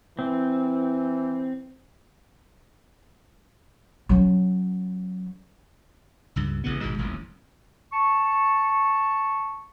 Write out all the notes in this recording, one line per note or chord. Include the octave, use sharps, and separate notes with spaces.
E3 C4
F#3 C#4
C#2 G2
A1 C#3 E3 B3
G#1 G#2 B2 G#3
D#1 A1 F2
A5 C#6